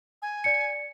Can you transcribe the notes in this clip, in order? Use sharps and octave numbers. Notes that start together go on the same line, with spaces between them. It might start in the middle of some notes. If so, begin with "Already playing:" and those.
G#5
D5 C#7